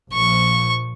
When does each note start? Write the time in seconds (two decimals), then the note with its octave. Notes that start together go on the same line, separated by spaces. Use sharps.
0.13 A#1 A#2 F3 C#6